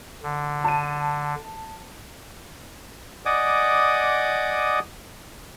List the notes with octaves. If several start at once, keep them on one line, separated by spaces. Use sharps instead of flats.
D3
A5 D#7
D5 D#5 F#5 G#5 D6 D#6